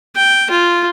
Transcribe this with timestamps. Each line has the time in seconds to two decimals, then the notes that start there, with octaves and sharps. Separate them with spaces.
0.16 G5
0.51 F4